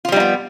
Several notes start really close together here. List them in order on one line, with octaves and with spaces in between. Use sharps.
F4 F3 G3 D#4 B3